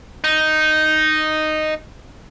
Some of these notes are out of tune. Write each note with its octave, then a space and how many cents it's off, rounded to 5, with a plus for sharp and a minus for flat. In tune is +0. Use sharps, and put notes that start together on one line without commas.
D#4 -5